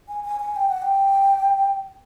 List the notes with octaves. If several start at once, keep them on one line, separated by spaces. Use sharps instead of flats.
G#5
G#5
G#5
G5
F#5
G5